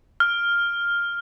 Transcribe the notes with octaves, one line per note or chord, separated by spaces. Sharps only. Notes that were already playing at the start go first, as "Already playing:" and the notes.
F6